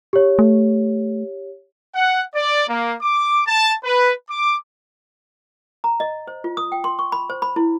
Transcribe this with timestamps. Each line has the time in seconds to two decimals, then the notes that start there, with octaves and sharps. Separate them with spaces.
0.13 G4 C#5
0.39 A3
1.94 F#5
2.35 D5
2.68 A#3
3.01 D6
3.46 A5
3.83 B4
4.30 D6
5.84 A#5
6.00 D#5
6.27 C5
6.44 F4
6.57 D#6
6.72 G5
6.84 C6
6.99 C#6
7.12 B5
7.30 C5
7.42 B5
7.56 E4